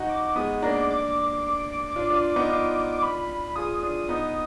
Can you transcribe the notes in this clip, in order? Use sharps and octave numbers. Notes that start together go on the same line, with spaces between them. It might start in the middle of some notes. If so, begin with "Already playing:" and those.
Already playing: D#4 F#4
D6
G#3 B3 D#6
A#3 D4 A#5
D6
D6
D4 F4
D4 F4
B3 D#4
D4 F4
B5
F4 G#4 D#6
D4 F4
B3 D#4